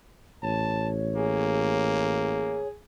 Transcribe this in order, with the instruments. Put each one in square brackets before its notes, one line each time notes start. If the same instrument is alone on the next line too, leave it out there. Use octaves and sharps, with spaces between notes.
[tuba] A1 [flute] C#5 [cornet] A5
[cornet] A#3 [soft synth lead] G#4